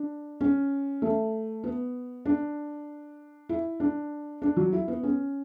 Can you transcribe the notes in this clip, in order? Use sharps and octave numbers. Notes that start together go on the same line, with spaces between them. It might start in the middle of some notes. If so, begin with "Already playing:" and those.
Already playing: D4
C#4
A3
B3
D4
E4
D4
D4
F#3
E4
B3
C#4